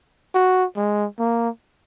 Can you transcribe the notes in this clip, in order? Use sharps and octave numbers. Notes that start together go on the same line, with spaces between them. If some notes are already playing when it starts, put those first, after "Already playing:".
F#4
G#3
A#3